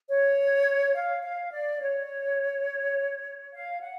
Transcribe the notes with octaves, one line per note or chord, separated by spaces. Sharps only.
C#5
F5
F5
D5
C#5
F5
F#5